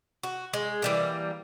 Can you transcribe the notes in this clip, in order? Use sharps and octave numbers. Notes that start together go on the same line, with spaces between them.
F#4
G#3
E3 G3 A#3